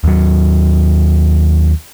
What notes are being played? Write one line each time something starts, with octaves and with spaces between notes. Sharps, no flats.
D#2 F#3